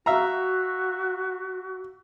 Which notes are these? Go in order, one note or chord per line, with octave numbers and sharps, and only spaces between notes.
F#4 E5 F5 A#5